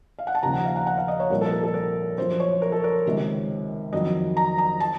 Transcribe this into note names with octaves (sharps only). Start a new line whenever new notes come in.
F5
F#5
A5
D#2 C#3 F3 A#5
F#5
F5
F#5
F#5
F5
D#5
C#5
C2 A#2 F3 A#4
A4
A#4
A4
A#4
F#2 F3 C5
C#5
A#4
A4
A#4
C#2 C3 D#3
F2 D#3 F#3 D#5
A#5
A#5
A5